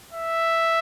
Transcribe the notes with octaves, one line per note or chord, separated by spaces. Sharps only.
E5